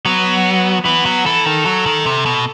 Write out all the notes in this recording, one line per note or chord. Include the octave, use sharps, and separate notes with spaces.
F#3 B3
E3 B3
F#3
E3 A4
D#3
F#3
D#3
C3
B2